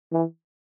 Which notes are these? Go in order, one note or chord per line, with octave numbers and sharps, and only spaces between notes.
E3